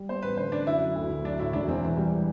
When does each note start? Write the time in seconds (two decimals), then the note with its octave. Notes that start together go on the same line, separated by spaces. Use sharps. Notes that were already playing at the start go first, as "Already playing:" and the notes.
Already playing: G3
0.09 B3 C5
0.23 A1 B4
0.37 D3 C5
0.52 D3 D4
0.67 F#2 E4
0.80 F#3
0.96 D2
1.09 D2
1.24 F#3 D4
1.39 A2 E4
1.53 E1 D4
1.68 E2 C4
1.83 E3
1.97 G3